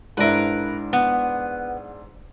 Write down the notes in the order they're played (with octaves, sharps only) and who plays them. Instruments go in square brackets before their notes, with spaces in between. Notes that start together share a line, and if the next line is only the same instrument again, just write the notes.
[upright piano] G#2 D4 E4 [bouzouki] A#4 B4
[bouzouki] B3